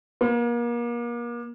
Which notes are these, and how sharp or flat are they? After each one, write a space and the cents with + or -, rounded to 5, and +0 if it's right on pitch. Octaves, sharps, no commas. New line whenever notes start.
A#3 +35